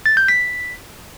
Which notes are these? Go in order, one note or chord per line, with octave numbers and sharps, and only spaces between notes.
A6
G6
B6